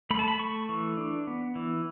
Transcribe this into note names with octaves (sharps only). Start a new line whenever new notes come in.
A3 B5
A5
B5
A3 C#6
E3
D4
B3
E3